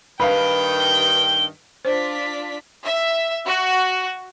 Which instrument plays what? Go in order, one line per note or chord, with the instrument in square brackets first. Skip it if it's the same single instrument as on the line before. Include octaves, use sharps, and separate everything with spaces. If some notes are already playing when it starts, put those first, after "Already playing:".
[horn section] G2 D#3 G5 [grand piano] B4 F5 B5
[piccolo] G7
[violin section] D4 F4 B6 [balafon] C5
[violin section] E5
F#4